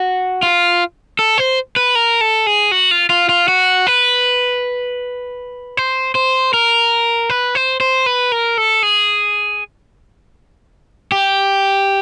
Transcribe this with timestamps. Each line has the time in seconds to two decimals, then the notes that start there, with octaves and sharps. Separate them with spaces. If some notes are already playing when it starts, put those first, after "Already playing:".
Already playing: F#4
0.43 F4
1.19 A4
1.38 C5
1.76 B4
1.95 A#4
2.21 A4
2.47 G#4
2.71 F#4
2.91 F4
3.10 F4
3.29 F4
3.48 F#4
3.87 B4
5.77 C5
6.15 C5
6.54 A#4
7.30 B4
7.55 C5
7.81 C5
8.06 B4
8.32 A#4
8.58 A4
8.83 G#4
11.12 G4